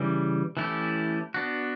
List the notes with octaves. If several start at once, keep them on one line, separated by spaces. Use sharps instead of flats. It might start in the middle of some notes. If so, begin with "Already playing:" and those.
Already playing: C#3 E3 G3
E3 A3 C#4 E4 G4
B3 D4 F#4